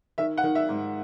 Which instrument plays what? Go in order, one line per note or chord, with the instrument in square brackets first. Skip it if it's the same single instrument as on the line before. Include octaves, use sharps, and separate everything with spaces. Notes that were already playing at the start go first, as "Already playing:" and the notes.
[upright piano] D#3 E5
F#5
D#3
E5
G#2